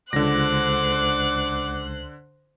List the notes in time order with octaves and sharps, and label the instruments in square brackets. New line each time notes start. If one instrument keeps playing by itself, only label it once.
[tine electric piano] C#2 [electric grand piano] D3 A#6 [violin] C5 F#6 [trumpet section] D5 F#5 D6